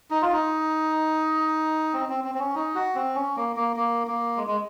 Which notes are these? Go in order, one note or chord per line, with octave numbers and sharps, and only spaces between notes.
D#4
F4
D#4
C4
C4
C4
C4
C#4
D#4
F#4
C4
C#4
A#3
A#3
A#3
A#3
G#3
G#3